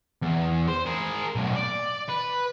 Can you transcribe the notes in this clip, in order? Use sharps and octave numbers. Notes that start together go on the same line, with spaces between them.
E2
C5
G#4 A#4
B1 A2
D5
B4